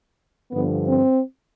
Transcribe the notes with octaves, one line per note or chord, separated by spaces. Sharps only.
G2 D3 F3 B3
C4